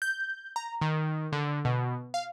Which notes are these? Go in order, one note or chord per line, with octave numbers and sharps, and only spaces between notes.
G6
A#5
D#3
D3
B2
F5